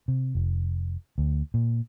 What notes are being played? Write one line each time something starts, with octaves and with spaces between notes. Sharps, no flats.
C3
F1
D2
A#2